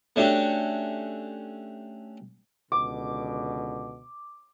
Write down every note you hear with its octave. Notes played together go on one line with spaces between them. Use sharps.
A3 C#4 D4 F#4 G4
C#2 B2 D3 D6